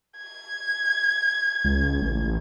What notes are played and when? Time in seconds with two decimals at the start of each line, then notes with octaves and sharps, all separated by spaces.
0.18 G#6
1.64 C#2
2.02 A1